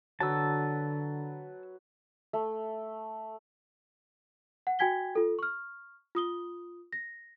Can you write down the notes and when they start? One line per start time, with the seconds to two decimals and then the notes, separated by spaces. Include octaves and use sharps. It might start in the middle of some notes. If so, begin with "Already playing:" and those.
0.20 D3 F#3 B4 A5 E6
2.33 A3
4.67 F#5
4.79 F#4 G5 G#5 G#6 B6 G7
5.15 F4 A4
5.39 C#6 F6
6.15 F4 D#6 G7
6.93 A#6